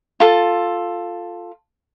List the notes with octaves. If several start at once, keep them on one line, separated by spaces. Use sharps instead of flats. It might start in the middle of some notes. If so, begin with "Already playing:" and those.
F4 A4